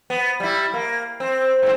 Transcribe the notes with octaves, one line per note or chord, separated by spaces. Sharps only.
B3
G3 E4
A#3
C4
G#2 C4